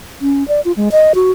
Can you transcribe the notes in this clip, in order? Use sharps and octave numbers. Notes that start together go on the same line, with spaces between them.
C#4
D5
F4
G#3
D#5
F#4